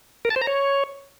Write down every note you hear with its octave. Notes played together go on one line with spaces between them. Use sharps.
A#4
A5
C5
A#5
C#5